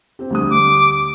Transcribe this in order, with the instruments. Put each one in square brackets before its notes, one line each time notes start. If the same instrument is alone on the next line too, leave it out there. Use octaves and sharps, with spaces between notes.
[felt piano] C4 G4
D2 G3 D#6
[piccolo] D6